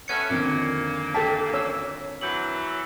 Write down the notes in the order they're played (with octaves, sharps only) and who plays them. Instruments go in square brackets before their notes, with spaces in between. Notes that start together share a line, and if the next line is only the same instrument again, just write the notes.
[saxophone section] A3 B3 C#4 [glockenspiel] F6 G#6 C#7
[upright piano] F2 D3 D#3 [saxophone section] A#2 A#3
[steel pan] A4 G5 A5 [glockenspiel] B6
[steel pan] C#5 E6
[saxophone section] E3 F#3 [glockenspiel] G6 F#7